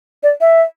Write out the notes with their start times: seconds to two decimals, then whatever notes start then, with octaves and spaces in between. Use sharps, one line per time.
0.23 D5
0.41 E5